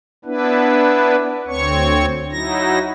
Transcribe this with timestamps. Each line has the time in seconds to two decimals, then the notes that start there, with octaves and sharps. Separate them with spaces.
0.25 B3 D4 E4 B4
1.47 D2 C4 C#5 C#6
2.32 F#3 D#4 E4 A#6